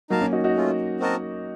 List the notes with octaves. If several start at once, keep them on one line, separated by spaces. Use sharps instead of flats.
F#3 A#3 D#4 A#4 F5 A5
A#3 C#4
D#4 F#4
D#4 F#4
A3 C#4 F4
C4 F#4 A#4 D#5 A5